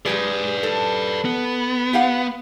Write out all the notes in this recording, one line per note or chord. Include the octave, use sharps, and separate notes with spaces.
G#3 G4 G#4 B4 D5
A4
B3
G4 F5 F#5